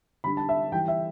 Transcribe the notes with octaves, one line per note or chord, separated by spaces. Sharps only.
D3 G3 D4 B5
A5
E5
E3 G3 E4 G5
E5